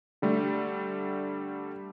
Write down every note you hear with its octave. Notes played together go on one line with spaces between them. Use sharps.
D3 G3 A3